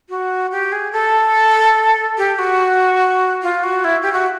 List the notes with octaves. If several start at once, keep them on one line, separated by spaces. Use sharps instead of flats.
F#4
G4
G#4
A4
G4
F#4
F4
F#4
E4
G4
F#4